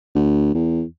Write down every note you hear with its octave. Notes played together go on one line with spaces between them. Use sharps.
D2
E2